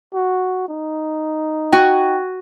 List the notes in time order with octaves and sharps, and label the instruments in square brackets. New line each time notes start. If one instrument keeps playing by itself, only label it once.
[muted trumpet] F#4
D#4
[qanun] F#4 G#5 [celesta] G5